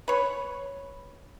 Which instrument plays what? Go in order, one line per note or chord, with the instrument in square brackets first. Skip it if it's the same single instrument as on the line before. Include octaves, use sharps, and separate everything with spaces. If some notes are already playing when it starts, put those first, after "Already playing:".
[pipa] B4 C#5